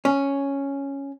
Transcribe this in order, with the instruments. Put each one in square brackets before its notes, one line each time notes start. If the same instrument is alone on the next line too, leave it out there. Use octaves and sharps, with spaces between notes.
[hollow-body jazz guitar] C#4